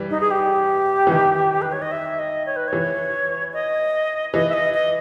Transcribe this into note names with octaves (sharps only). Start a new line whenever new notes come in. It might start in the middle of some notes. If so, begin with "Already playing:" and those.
Already playing: E3 G3
D#4
G#4
G4
E3
D#3
B4
C#5
D#5
E5
D#5
C#5
B4
E3 C#5
D#5
E3 D#5
E5
D#5
D#5